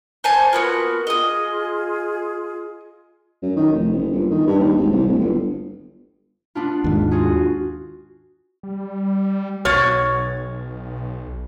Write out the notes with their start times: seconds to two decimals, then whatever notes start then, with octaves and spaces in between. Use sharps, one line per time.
0.24 C5 G#5 A5
0.53 A#3 B3 F4 F#4 B4
1.07 F4 G#4 D#5 D#6
3.43 F#2
3.56 D#3
3.73 F1
3.92 F#1
4.12 G1
4.31 D#3
4.47 G2
4.59 D#2
4.77 G#1
4.91 C2
5.07 D1
5.20 G1
6.55 B3 D4 F4
6.84 D#2 G#2
7.11 F4 F#4 G#4
8.63 G3
9.65 B1 B2 F#4 C#5 F6 A6